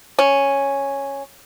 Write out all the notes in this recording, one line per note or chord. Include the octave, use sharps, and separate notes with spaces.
C#4